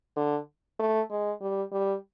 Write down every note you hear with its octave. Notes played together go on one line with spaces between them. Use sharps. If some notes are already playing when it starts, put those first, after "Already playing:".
D3
A3
G#3
G3
G3